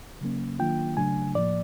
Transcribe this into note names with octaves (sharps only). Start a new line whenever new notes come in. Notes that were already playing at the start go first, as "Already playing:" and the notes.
C#3 F#3 A#3 C#4
D#3 F#3 A#3 D4 F4 G5
C#3 F#3 A3 D4 G#5
A2 F3 A#3 D5